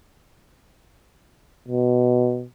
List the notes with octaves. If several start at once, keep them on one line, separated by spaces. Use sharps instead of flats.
B2